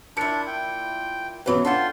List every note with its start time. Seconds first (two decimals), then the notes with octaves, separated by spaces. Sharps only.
0.17 A#2 D4 E4 G6 C#7
0.47 G5
1.46 E3 F#3 B3 C#4 B4
1.65 D4 F4 A4 F#5 G5 C6